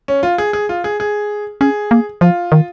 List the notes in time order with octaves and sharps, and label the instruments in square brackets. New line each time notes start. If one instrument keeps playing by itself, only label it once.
[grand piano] C#4
F4
G#4
G#4
F4
G#4
G#4
[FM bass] C#4 [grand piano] G#4
[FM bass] A#3
[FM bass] F3 [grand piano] F4
[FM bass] D#3